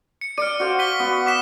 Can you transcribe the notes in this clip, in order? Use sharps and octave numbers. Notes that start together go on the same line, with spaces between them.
C#7
D5 F6 C#7 D#7
F#4 C5 F5
B6 D#7 G7
B3 F#4
D6 B6 E7